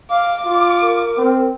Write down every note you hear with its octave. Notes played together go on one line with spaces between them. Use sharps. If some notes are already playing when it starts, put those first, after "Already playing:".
F5 D6
F4
A#4
C4